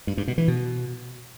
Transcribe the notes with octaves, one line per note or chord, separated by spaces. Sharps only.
G2
G2
B2
E3
B2